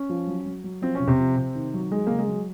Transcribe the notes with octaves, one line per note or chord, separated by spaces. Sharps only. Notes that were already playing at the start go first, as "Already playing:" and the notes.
Already playing: C#4
F3
F#3
F#3
F#3
F3 C4
C3 C#4
C3 C4
F3
C3
D#3
F#3
F#3 G#3
C#3 A#3
G#3
F#3